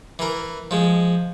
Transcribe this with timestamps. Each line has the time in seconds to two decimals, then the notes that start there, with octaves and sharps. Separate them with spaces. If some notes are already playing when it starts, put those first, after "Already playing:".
0.19 E3 A#4
0.71 F3 G#3